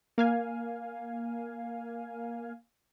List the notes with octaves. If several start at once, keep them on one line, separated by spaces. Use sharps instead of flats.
A#3 F5 G#5